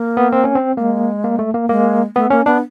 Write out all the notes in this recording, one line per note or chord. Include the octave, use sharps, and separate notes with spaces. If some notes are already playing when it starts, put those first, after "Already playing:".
Already playing: A#3
B3
C4
C#4
C4
G#3 A3 A#3
A#3
A3
A#3
G#3 A#3
A3 B3
A#3 C#4
B3 D4